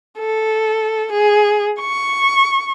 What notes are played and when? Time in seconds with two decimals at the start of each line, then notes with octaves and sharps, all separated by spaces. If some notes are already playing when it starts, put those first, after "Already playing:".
0.19 A4
1.12 G#4
1.81 C#6